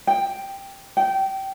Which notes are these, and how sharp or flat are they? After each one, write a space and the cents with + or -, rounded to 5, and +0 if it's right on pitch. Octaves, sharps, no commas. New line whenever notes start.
G5 +5
G5 -20